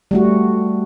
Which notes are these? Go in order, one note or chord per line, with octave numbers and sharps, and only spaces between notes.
G3 A3 F#4